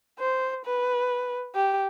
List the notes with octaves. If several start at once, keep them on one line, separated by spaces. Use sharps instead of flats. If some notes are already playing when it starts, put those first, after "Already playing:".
C5
B4
G4